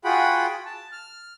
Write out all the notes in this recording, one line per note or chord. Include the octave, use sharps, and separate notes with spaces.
F4 F#4 G#4 F#5 G5 B5
A5
F6